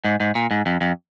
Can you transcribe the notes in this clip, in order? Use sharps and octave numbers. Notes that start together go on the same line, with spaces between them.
G#2
G#2
A#2
G#2
F2
F2